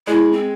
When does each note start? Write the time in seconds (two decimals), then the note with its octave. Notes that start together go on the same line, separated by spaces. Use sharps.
0.07 G#3 E4
0.33 C4